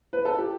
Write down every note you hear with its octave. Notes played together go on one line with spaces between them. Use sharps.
B4
A4
G4